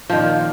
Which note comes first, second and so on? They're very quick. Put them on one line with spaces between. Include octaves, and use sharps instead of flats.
F3 D#3 A#2